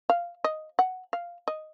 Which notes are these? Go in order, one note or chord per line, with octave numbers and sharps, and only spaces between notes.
F5
D#5
F#5
F5
D#5